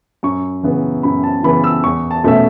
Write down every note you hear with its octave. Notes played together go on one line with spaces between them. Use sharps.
F#2 C#6
C#3 E3 B3
F#2 B5
A5
C#3 E3 B3 B5
E6
E2 C#6
A5
B2 A3 C#4 E5